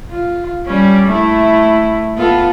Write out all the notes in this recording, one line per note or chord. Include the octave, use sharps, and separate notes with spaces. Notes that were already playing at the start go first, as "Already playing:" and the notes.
F4
G3 C#4
A3 E4
B3 F4 A4